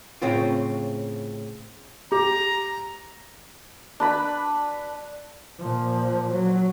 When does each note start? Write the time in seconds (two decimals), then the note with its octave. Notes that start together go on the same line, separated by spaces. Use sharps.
0.22 A2 C#3 C4 F4
2.12 G4 A#5
4.00 D4 B4 B5
5.60 A#2 F3
6.33 F#3